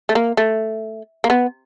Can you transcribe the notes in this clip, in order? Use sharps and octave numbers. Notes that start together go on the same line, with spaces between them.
A3
A#3
A3
A#3
B3